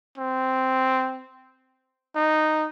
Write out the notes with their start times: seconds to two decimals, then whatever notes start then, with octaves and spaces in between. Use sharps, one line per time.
0.18 C4
2.15 D#4